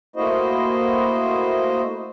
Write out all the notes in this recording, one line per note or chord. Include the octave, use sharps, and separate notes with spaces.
A3 A#3 E4 F#4 C5 D#5